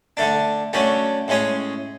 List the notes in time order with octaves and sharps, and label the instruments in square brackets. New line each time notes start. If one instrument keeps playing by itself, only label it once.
[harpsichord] D3 A3 D4
D3 F#3 A3 C#4
A2 G#3 C#4 G#4